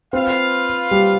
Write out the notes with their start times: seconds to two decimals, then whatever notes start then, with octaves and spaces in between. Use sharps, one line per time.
0.13 C4 F4 B4 F5
0.91 G3